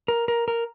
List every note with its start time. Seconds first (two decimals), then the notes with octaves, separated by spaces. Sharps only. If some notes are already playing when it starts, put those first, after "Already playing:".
0.08 A#4
0.28 A#4
0.48 A#4